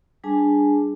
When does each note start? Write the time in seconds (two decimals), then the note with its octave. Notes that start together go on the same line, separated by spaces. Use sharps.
0.24 G3 D4 G#4 G#5 A5